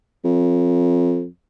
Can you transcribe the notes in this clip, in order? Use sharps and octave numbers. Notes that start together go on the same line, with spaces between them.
F2